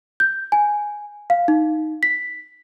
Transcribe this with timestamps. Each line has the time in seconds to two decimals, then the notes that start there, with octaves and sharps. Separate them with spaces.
0.20 G6
0.52 G#5
1.30 F5
1.48 D#4
2.03 B6